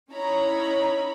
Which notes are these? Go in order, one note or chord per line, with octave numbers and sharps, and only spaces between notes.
C#4 D#4 E4 C#5 A#5 B5